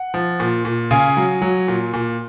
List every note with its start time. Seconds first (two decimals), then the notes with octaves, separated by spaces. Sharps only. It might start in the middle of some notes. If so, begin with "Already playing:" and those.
Already playing: F#5
0.14 F3
0.40 A#2
0.65 A#2
0.91 C#3 F5 G#5
1.17 F#3
1.42 F#3
1.68 A#2
1.93 A#2